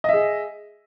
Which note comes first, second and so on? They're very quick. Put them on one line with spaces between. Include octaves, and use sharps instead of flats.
D#5 E5 G#4